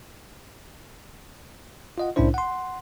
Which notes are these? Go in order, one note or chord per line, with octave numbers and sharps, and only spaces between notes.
F4 D#5 F#5
C2 A2 C#4 D4 E4 C5
F#5 C6